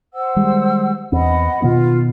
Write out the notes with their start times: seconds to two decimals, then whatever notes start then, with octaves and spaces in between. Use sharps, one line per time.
0.13 C5 F#5 E6
0.36 D#3 G3 G#3
1.12 E2 C4 D#5 F#5 B5
1.62 B2 D#3 B3 F4